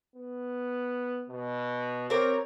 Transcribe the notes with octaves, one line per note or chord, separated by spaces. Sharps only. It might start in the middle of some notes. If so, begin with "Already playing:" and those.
B3
B2
C4 G4 A#4 C#5